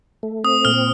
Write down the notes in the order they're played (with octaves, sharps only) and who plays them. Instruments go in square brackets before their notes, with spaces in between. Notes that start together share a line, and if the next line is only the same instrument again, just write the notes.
[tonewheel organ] A3
[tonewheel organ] C4 [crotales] D#6
[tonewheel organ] A#2 [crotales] F6